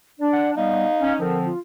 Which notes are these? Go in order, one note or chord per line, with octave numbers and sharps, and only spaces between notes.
D4 D5
F#5
G3 B3 D#4 F5
C#4
D3 F3 C4 A#4
F4